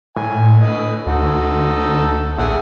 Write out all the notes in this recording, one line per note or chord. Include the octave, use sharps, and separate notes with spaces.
A2 G#5
D3 B4 D#5
D2 D#4 F#4 A4
A#1 G#4 E5 F#5